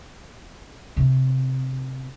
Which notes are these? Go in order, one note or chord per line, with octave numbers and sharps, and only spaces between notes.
C3